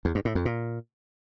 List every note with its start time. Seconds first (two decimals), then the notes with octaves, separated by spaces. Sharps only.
0.05 E2
0.15 G2
0.25 A2
0.35 F2
0.45 A#2